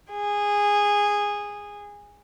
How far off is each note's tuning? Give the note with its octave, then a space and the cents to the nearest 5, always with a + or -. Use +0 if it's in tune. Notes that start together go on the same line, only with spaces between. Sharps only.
G#4 -15